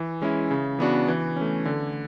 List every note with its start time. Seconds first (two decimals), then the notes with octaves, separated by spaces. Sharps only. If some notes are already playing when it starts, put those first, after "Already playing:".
Already playing: E3
0.22 G#3 C#4 E4
0.51 C#3
0.79 E3 B3 D4 F#4
1.08 E3
1.36 A3 C#4
1.65 D3